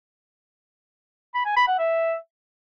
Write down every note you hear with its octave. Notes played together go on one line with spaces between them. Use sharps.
B5
G#5
B5
F#5
E5